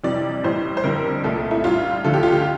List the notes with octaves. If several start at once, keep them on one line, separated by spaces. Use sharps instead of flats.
F2 C3 E3 G3 D5
A2 E3 G3 C5
C5
F2 D3 G3 A#4
C2 A#2 A3 A4
E4
A2 G3 F4
D2 D3 F3 A3 A4
G4
F4
G4